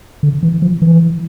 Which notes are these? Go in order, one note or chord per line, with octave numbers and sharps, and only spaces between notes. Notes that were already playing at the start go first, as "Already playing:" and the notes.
D3
E3
F3
E3